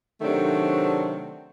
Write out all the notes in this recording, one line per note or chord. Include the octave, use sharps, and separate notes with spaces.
C3 D#3 F#3 A3 C4 D4